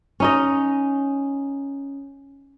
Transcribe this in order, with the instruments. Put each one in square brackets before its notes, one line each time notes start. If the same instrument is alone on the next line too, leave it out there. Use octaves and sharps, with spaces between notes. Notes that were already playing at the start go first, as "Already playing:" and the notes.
[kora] C#4 D#4 D#5